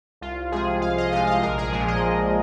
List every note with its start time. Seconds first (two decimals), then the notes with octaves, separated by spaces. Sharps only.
0.21 C2 F4
0.52 C3 F3 G#3 G#4
0.82 C2 F5
0.98 D#5
1.12 C3 F3 G#3 F5
1.27 D#5
1.43 A#1 A#4
1.58 G#4
1.72 A#2 F3 G#3 A#4
1.88 D#5
2.04 A#1